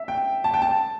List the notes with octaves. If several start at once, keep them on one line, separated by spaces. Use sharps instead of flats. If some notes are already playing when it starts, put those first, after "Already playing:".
Already playing: E5
G5
A5
G5
A5